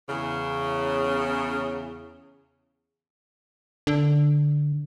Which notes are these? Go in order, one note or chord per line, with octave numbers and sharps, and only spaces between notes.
E2 C#3
D3